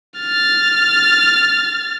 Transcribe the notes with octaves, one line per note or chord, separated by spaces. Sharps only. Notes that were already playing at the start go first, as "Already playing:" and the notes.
F6 A6